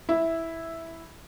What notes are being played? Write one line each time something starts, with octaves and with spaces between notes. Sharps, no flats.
E4